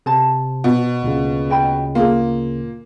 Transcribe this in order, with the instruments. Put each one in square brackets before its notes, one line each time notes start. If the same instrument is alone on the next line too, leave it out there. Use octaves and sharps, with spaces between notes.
[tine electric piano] C3 [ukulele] C5 A5
[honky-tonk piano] B2
[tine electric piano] D2 A#2 C#3
[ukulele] D#5 G5 B5
[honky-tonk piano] A#3 [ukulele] F4 G#4